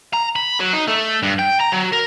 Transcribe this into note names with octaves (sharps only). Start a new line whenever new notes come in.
A#5
B5
F#3
D#4
A3
G2
G5
A#5
F#3
A#4